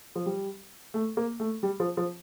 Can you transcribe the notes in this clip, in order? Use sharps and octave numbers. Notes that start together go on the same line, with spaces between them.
F3
G3
A3
A#3
A3
G3
F3
F3